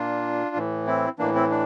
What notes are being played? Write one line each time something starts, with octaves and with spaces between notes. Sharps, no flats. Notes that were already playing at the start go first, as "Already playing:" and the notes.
Already playing: A#2 D4 F4
A2 E3
C4 E4
A2 E3 A#3 D4
C4 E4
D4